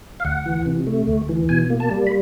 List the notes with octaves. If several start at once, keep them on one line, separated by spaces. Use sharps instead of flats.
F5
D2 F#5
E3
C3
A3
D2
E3
B2 G#5
A#3
A5
G3
B5